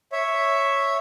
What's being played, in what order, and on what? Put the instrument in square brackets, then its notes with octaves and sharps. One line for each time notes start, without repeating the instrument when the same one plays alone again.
[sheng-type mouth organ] C#5 E5